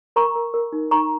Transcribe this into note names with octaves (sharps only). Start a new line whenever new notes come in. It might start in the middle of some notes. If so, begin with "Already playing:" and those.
A#4 A#5 C#6
A#4
A#4
D#4
D#4 A#5 C#6